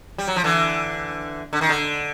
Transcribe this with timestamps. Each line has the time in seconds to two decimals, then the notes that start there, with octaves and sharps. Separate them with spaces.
0.18 G3
0.28 F#3
0.36 F3
0.44 D3 E3
1.53 D3
1.61 D#3
1.69 D3